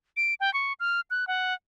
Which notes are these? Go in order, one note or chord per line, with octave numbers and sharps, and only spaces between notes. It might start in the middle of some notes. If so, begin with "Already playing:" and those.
D7
G5
C#6
F6
F#6
F#5